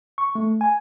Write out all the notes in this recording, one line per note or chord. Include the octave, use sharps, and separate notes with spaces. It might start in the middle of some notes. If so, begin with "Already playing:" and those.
C#6
A3
G#5